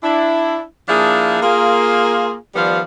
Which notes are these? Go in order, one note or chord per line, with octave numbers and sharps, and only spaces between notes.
D4 E4
F3 A#3 D4 E4 G#4
A#3 F4 G#4
D#3 F3 G3 B3 D5 F5